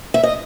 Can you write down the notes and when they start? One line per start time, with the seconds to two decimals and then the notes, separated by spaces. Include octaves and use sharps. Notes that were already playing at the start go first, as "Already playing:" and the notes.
0.14 E5
0.23 D#5